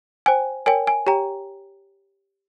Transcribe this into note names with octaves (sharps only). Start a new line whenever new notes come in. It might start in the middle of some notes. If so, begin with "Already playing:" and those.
C5 G5 G#5
A#4 C#5 G5 G#5
G#5
G4 C#5 G5 A#5